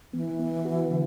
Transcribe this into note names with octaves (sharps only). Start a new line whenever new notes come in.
E3 B3
B3
F#4
D3